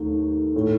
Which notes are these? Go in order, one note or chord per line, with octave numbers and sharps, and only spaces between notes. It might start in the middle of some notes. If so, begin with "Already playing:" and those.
Already playing: D#2 D#3 A3 D#4
A2 A3